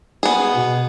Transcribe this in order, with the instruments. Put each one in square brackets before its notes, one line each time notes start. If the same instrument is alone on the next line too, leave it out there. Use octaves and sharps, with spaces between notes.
[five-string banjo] B3 G#4 [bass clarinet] F#4
[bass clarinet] B2